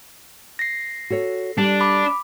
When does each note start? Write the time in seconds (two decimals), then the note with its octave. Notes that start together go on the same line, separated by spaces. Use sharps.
0.59 A#6 C7
1.10 F#4 A4 C#5
1.58 G3 D4 A5
1.81 B5 D6